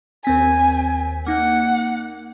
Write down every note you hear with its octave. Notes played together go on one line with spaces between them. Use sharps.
D#2 C4 G#5 B6
A#3 D#4 F#5